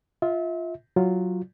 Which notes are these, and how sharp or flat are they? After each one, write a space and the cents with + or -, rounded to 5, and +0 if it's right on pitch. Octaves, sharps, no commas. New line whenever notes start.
F4 +0 E5 -35
F#3 +0 F4 +0